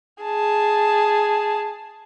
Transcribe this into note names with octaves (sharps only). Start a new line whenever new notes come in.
G#4 A5